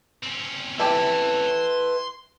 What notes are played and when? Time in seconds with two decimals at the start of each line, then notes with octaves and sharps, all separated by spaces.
0.23 C4 C#4
0.80 A3 G4 B4 E5
1.47 C6